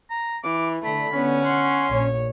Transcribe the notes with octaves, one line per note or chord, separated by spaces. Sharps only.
A#5
E3 D6
D3 A3 B5
B3 C#4
F#5 C6
A#1 C#5